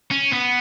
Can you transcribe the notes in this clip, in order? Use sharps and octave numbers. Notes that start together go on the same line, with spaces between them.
C#4
B3